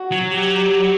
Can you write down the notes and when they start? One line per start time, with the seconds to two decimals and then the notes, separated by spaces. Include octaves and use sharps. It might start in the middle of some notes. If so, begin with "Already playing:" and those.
Already playing: F#4
0.12 F#3
0.32 G4